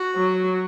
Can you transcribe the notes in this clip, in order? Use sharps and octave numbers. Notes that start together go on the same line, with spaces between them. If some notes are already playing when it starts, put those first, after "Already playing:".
Already playing: F#4
F#3